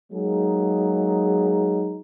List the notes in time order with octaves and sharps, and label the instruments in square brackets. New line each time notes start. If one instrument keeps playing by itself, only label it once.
[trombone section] F#3 G#3 A#3 D#4 G#4